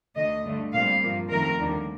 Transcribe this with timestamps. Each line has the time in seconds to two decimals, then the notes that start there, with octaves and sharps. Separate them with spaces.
0.16 D2 D3 A3 D#5
0.45 G2 D3 A3
0.73 A#2 G3 C4 F5
1.02 G2 F3 A#3
1.29 F2 D#3 A3 A#4
1.58 D#2 D3 G3 A#3